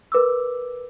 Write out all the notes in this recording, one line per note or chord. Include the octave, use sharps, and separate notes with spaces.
A#4 B4 D6 E6